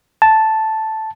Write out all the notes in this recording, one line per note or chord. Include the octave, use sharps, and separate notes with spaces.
A5